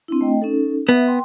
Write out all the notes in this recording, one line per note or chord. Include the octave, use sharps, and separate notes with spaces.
C4 D4 E4
A3 D#5 G5
C#4 D#4 A4
B3 E5
G5 C6